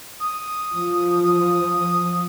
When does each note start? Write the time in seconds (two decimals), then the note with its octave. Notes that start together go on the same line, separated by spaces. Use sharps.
0.20 D#6
0.73 F3
1.23 D#6